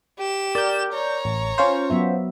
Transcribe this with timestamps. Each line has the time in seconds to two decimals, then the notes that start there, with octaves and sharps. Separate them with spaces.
0.19 G4 E7
0.55 A#4 D5 G6
0.93 C#5 A#5
1.25 A1
1.58 C#4 F4 C5
1.90 F#3 B3 E5